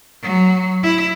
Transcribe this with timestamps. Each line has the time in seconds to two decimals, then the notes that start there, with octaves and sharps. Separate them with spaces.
0.23 F#3
0.83 E4